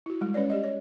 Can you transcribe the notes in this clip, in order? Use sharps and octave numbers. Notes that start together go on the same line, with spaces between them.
E4 F#4
G3 G#3
G#3 C#4 B4 C#5 D5
G4 D5 D#5
C#5